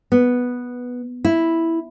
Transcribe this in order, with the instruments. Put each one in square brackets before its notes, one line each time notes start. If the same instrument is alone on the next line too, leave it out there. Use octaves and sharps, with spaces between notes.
[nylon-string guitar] B3
E4